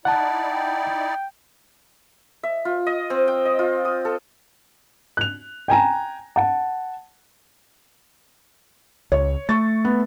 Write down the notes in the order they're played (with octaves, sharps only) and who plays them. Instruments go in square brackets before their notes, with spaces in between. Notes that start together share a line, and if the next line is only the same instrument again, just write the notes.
[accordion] D#4 E4 D5 [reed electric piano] F#5 A5
[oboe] G5
[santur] E5
F4
D#5
C4
G5
D#5
F4
D#6
A4
[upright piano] F#6 F7
G5 G#5 A#5
F#5 A5
[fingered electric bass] C#2 [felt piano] C#5
[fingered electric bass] A3 [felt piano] C#6 A6
[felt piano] B3